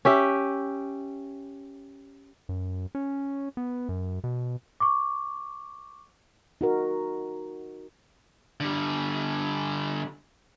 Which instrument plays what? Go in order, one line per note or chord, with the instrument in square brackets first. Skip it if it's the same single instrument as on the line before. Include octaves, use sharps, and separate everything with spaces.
[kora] C#4 G4 E5
[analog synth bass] F#2
C#4
B3
F#2
B2
[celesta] C#6 D6
[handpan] D#4 F#4 A#4
[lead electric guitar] D3 G3